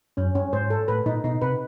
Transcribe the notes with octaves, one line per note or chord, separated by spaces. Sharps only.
F#2 C#4
G2 C#4
G#2 C5
A4
A2 B4
A#2 D#4
B2 D#4
C3 B4